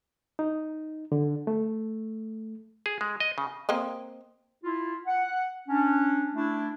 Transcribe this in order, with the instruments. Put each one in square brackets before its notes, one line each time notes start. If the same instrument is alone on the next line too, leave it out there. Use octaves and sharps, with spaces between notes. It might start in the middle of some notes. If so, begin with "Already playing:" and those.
[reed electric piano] D#4
D3
A3
[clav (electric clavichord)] G#4
G#3
D#5
C#3
[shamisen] A#3 C4 D#5
[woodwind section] E4 F4
F#5
C#4 D4
A3 D4 E4